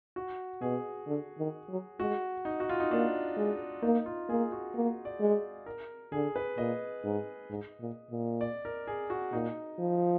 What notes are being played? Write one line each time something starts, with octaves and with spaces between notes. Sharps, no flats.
F#4
B2 G#4
D3
D#3
F#3
G#3 F#4
D#4
F#4
F4
D#4
A#3 D4
G#3
A#3 D#4
F4
A#3 G#4
F#4
A#3
D5
G#3
A#4
D3 G#4
B4
A#2 D#5
G#2
G#2
A#2
A#2
D5
A#4
G#4
F#4
A#2 D#4
F3